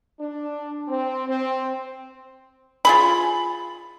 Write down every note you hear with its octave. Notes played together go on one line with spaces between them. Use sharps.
D4
C4
C4
F4 G#4 B5